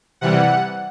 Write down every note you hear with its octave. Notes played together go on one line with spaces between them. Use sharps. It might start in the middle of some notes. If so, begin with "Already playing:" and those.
C3 E3 G3 F#5